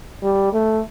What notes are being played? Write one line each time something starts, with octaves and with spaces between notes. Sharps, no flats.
G3
A3